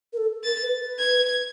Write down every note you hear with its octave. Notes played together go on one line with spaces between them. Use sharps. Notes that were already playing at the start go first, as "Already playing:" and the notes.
A#4
A4
A#4 A6
B4
B4
G#6